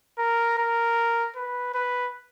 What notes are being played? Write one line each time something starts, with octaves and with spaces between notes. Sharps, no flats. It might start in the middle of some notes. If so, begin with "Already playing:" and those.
A#4
A#4
B4
B4